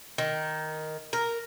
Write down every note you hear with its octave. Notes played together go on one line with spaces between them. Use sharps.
D#3
A#4